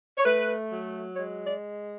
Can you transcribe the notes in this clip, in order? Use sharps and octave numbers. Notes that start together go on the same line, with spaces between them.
C#5
A3 B4
F#3
G#3 C#5
D5